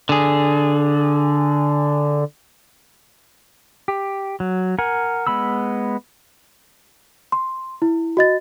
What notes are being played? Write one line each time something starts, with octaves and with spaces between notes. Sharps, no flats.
D3 G#4
G4
F#3
A#4 F#5 G#5
G#3 B3 B5 E6
C6
E4
F#4 D#5 A6